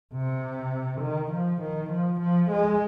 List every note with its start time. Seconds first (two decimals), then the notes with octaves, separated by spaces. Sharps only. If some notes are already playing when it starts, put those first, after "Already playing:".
0.14 C3
1.01 D#3
1.31 F3
1.62 D#3
1.90 F3
2.21 F3
2.51 G#3